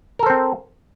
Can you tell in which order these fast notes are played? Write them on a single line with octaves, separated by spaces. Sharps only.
A#4 A4 C5 C4